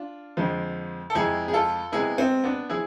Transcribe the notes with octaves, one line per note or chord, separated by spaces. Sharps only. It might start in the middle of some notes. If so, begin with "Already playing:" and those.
Already playing: D4 F4
F2 D3 F3 G#3
A4
F2 C3 G#3 E4 G#4
G#4
F4 A4
C3 G#3 B3 E4 G#4
C4
B3 D4
F3 E4 G#4